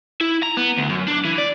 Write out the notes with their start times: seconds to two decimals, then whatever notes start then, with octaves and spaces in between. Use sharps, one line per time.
0.21 E4
0.43 A#5
0.57 B3
0.78 D2
0.89 F#2
1.08 D4
1.25 E3
1.38 D5